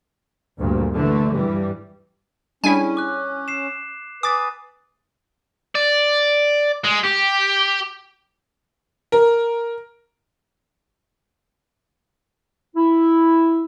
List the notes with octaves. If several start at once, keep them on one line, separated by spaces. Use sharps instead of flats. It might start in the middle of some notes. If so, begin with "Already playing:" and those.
D2 G2 A#2
D3 E3 A3
G2 E3 G3
G3 C#4 D4 E4 G#4 G#5
D6 F#6
C7 E7
B4 G#5 D6 D#6 A6
D5
G#3
G4
A#4
E4